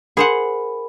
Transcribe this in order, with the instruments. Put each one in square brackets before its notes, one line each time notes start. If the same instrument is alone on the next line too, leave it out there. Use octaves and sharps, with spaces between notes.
[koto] G#4 C5 F#5 [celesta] A#4 B5